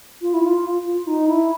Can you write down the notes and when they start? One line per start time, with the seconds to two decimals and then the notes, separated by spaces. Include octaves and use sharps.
0.22 F4
0.34 E4
0.43 F4
0.86 F4
1.07 D#4
1.28 E4